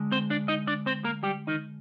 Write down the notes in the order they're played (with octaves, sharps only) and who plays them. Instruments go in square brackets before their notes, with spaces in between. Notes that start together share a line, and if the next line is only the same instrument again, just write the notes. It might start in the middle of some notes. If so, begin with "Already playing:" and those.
Already playing: [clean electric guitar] D3 G#3
C4 C5
D4 D5
D#4 D#5
D4 D5
C4 C5
A#3 A#4
G3 G4
D#3 D#4